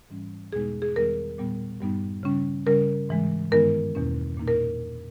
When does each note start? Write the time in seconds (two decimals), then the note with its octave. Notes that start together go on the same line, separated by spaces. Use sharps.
0.10 G#2 E3 G3 C#4
0.52 E2 B2 G#3 B3 D#4 G#4
0.82 G#4
0.96 E2 D#3 G3 B3 A#4
1.38 A#2 G3 B3
1.80 G2 G3 B3 D#4
2.23 C#3 G3 C#4
2.66 C#3 G3 C#4 A#4
3.09 G#2 E3 G#3
3.51 G2 D#3 G#3 B3 D#4 A#4
3.95 E2 B2 A#3 C#4
4.37 A#2 A#3 D#4
4.48 A#4